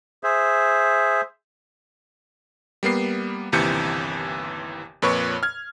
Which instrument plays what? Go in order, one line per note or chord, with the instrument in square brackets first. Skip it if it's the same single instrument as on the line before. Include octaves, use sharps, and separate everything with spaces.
[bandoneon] G#4 C5 E5
[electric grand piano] G3 A#3 B3 C7
G1 D#2 C3 E3 G6 C#7
F2 A#2 B4 C#5 C#6
F6 G#6